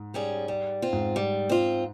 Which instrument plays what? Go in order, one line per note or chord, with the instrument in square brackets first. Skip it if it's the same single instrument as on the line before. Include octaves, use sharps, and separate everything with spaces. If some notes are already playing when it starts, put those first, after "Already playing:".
Already playing: [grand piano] G#2
[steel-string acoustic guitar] G3 C#4 G#4
G3
C4 F4
[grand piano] G#2
[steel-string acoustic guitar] G3
C4 F4